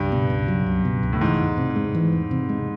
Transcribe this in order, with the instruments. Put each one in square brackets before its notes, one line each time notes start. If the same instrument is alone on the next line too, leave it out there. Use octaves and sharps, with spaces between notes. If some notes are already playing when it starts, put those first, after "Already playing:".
Already playing: [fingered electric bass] C#2 [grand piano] G2
[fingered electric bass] B2
C#2
F#3
C#2
B2
C#2
[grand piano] A2
[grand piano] G#2 [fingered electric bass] E3
[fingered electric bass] E2
C3
G#3
E3
E2
C3
G#3